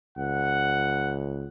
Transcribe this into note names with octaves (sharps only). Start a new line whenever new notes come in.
C#2 F#5